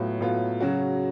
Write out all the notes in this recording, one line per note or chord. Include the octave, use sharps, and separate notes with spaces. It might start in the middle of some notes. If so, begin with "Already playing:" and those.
Already playing: A2 F#3 B3 F4
A2 F#3 B3 F4
C#3 F#3 C#4 F#4